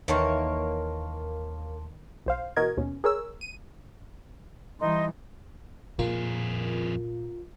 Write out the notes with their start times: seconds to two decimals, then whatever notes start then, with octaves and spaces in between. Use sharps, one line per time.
0.08 D#2 D#3 E3 A#3 C#5 A5 C6
2.26 B1 C5 F5
2.57 B2 E3 F#4 A#4 D#5 G#6
2.77 D#2 G#2 B2 C#4
3.04 G#4 A#4 C#5 E6
3.41 D#7
4.80 E3 G3 D#4 C6
5.99 F2 A#2 F4 G#4 A#4